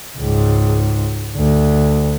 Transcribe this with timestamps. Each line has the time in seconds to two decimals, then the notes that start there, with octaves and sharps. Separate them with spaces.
0.17 C#2 G#2
1.36 D2